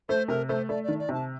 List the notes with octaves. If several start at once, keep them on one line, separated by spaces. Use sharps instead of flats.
A3 C5
C3 A#4
A3 C5
A3 D5
D#3 D5
D5
C3 A5